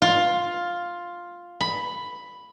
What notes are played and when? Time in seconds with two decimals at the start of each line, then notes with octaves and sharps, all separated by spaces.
0.02 F4
1.60 B5